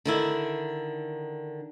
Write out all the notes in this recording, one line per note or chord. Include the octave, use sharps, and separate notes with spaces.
D3 D#3 E4